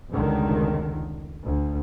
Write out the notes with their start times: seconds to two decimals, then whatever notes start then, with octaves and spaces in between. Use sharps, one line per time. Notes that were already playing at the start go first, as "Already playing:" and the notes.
0.11 F1 C#2 D3 D#3
1.43 D2